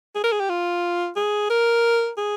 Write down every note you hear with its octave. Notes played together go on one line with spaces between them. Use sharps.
G#4
A#4
G#4
G4
F4
G#4
A#4
G#4